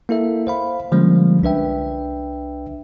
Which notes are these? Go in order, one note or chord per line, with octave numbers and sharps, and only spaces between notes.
A#3 E4 A4 E5
C5 F5 B5
D3 F3 G3 G#3 A#3 C#4
C2 D4 B4 E5 G5